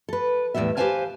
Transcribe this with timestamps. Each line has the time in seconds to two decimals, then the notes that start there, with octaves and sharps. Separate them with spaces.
0.09 A4 B4
0.54 E2 A2 C3 G3 B3 E5
0.77 G4 B4 C5 F5 G#5 A5